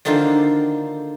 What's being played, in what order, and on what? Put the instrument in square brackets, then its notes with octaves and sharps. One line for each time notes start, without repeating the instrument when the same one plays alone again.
[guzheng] D3 D#3 A#3 D4 F4 C5